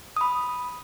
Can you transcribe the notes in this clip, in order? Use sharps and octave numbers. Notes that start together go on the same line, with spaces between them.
B5 D#6